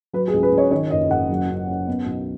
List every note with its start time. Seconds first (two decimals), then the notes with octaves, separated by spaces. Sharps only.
0.13 F#3 B4
0.28 G#4
0.34 C#2
0.43 B4
0.52 C#2
0.58 C#5
0.71 D#3 C#5
0.90 F#1 D#5
1.10 F#1 F#5
1.29 F#3
1.49 F#2
1.68 C#4
1.88 B3
2.06 B1